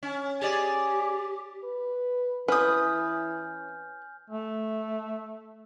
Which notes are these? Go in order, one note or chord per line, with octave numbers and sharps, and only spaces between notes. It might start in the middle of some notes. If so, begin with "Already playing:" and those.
C#4
G4 G#4 D5
B4
E3 C#4 B4 G#5 D#6 F6 G6
A3